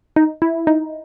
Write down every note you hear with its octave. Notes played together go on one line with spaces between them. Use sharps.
D#4
E4
D#4